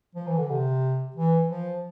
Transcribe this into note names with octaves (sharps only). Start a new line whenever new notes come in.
F3
E3
D3
C3
E3
F3